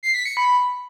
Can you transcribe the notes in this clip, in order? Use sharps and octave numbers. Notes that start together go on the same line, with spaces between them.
C7
B6
C#7
B5